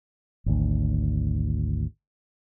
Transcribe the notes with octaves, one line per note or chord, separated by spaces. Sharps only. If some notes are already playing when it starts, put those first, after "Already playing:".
G#1 D2